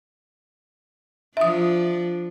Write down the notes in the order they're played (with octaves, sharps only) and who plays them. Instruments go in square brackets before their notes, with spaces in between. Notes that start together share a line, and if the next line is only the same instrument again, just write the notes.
[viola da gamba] F3 D4 [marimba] E5 D#6